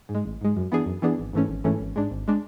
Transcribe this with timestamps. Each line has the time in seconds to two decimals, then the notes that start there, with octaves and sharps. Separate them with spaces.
0.09 G#2
0.15 G#3
0.25 A1
0.41 G#2 G#3
0.57 F#2
0.72 E3 B3 D4 G#4
0.86 F#2
1.02 E3 B3 D4 G#4
1.18 G#1
1.33 G#2 E3 A3 C#4
1.49 G#1
1.64 G#2 E3 A3 C#4
1.80 G#1
1.96 G#2 G#3 D4
2.11 G#1
2.28 G#3 D4